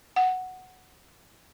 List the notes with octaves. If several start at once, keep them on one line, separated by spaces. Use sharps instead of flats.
F#5